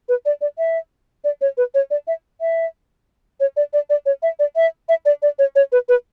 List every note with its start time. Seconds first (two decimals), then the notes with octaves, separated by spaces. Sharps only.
0.09 B4
0.26 D5
0.41 D5
0.58 E5
1.24 D5
1.41 C#5
1.57 B4
1.74 C#5
1.91 D5
2.07 E5
2.41 E5
3.40 C#5
3.57 D5
3.73 D5
3.90 D5
4.06 C#5
4.23 E5
4.39 D5
4.56 E5
4.89 E5
5.06 D5
5.22 D5
5.39 C#5
5.56 C#5
5.72 B4
5.89 B4